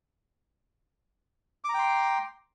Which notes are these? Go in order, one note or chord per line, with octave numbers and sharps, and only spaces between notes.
G5 A#5 C6 D6